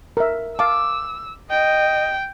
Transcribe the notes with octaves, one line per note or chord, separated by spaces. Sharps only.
A#4 E5
F5 A5 D6 E6
D#5 G5